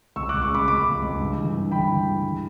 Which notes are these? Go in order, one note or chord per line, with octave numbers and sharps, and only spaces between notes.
C#2 C#6 E6
D6 F#6
C#2
C#6 E6
C#3 B5 D6
C#2 B5 D6
C#2
C#2
G2
E3
G2
E3 G5 B5
E3
G2
E3